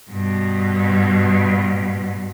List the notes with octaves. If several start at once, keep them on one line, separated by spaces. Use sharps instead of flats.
G2 B2